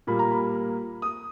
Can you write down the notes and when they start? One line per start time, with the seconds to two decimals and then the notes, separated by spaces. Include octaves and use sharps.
0.07 A#2 G3 A#3 B5
0.19 A#5
0.31 B5
1.02 D#6